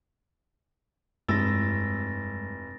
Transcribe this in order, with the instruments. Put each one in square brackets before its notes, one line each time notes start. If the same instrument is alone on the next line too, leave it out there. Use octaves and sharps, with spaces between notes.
[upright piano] F1 E6 [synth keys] G2 [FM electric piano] G#3 A3 E4 [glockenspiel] A6 A#6